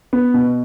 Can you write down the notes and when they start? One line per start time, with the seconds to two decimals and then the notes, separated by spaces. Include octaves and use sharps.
0.13 B3
0.34 B2